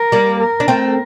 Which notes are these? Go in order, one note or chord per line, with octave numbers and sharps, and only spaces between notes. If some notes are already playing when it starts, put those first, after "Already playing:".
Already playing: A#4
G3 A#3
A#4
D4
A3 C4